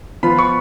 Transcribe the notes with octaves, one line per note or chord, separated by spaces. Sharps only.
F3 B3 F4 B5
C#6